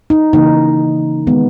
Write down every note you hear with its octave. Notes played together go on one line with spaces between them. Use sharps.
D#4
C#3 E3 A#3 D#4
D#3 G#3 B3